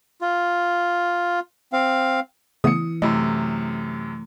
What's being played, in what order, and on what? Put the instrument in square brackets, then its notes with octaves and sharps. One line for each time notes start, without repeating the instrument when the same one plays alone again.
[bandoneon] F4
C4 F5
[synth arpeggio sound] C#3 A3 B3 [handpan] E3 [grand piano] D#6 C#7
[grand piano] F#2 C3 [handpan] A3 [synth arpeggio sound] E4 D#5